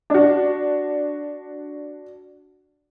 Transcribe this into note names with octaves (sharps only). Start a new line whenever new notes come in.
D4 F#4